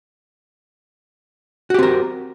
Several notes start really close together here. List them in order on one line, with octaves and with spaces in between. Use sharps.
F#4 G4 C4 A#4